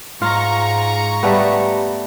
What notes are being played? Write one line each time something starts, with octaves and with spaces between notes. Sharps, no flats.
G#2 F4 A#5 C#6
G3 A3 B3